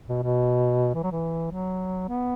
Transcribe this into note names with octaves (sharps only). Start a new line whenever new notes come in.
B2
B2
E3
F#3
E3
F#3
B3